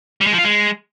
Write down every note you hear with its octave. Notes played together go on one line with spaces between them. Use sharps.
G3
G#3
F3
F4
G#3